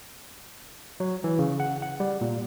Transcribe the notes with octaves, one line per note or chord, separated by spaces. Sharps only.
F#3
E3
C#3
F#5
F#5
G3
A#2